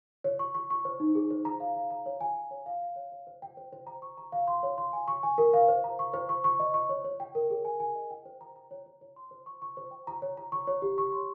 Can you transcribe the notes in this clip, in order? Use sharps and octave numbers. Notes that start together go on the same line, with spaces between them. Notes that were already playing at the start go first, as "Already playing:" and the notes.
C#5
C#6
C#6
C#6
C5
D#4
G#4
C5
A#5
F5
F5
A#5
C#5
G#5
C#5
C#5
F5
F5
C#5
C#5
C5
G5
C5
C5
A#5
C#6
A#5
F5
C6
C#5
C6
G#5
C#6
G#5
A#4
F5
C5
A#5
C#6
C5
C#6
C#6
D#5
C#6
C#5
C#5
G5
A#4
G#4
G#5
G#5
D#5
G5
C5
A#5
A#5
C#5
C#5
C#5
C6
C5
C#6
C#6
C5
G5
A#5
C#5
A#5
C#6
C#5
G4
C#6
C6